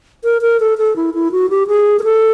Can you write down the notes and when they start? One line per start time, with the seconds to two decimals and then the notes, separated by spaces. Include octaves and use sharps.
0.24 A#4
0.42 A#4
0.60 A4
0.78 A4
0.96 E4
1.14 E4
1.32 F#4
1.50 G4
1.68 G#4
1.99 A#4
2.04 A4